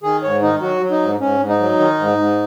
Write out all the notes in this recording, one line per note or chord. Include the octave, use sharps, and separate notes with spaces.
D#3 G#4
G#2 C#5
D#3 D#4
F#3 F#4
F#3
D#4
G#2
G#2 C#4
G#2
D#4
F#3
D#3
G#2
G#2